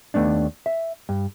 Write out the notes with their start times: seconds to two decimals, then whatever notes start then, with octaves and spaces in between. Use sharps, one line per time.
0.14 D#2 A3 B3 D4
0.66 E5
1.09 G2